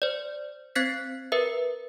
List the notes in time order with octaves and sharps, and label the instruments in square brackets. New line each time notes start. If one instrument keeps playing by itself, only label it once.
[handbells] C5 D5
C4 C5 F#6 G#6 B6 C7
A#4 B4 E5